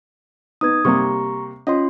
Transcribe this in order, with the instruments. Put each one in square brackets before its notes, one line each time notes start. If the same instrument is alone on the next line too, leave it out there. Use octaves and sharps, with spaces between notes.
[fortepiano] B3 D#4 [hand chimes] D#6 G#6
[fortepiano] C3 G3 A#3 [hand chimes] A#5 C#6
[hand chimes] C#4 F4 C6 [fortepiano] D#5